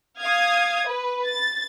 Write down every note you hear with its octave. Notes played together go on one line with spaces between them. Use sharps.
F5 D#6 G#6
B4
A6